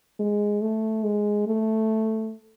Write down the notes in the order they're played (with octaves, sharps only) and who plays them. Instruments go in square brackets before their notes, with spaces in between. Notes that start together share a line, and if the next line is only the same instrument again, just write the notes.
[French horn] G#3
A3
G#3
A3